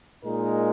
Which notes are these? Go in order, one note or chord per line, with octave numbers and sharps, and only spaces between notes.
A#2 G#3 D#4 A#4